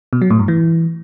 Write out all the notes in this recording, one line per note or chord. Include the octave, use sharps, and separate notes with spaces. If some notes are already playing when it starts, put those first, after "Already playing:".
B2
F#3
A2
G2
E3